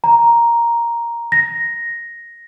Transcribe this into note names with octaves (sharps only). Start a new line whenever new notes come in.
A#5
A#6